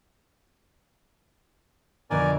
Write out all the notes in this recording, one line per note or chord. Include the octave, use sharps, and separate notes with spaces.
F2 B2 D3 A#4 D5 G#5